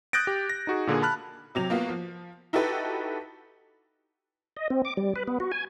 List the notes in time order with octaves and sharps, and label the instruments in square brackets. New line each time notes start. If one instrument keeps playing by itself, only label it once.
[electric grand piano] D#6 F#6 G6 A6 A#6 D7
G4
A#6
D#4 F#4 G#4
A#2 D3 A#3 G#4
A5 B5 F6 F#6
[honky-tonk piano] C3 F#3 F7
A#3 B3 F4 F#4
F3
D#4 E4 F#4 G4 A4 B4
[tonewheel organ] D#5
C4
D6
G3
B4
B3
F#4
G#5